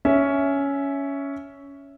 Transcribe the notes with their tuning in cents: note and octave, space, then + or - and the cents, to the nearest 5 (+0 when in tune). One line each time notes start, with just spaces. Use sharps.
C#4 +10 E5 +0